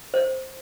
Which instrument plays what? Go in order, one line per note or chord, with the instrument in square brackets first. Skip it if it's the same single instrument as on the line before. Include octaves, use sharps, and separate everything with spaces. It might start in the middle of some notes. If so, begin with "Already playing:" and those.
[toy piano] C5